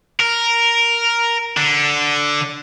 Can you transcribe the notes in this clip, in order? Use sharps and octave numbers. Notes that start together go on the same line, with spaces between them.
A#4
D3